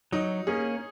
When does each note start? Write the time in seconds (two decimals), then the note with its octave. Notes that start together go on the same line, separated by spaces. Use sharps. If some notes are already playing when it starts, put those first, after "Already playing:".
0.12 F#3 D#4
0.47 A#3 C#4 G#4